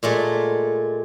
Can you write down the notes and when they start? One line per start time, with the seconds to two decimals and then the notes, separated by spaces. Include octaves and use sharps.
0.03 A#2 G#3 A3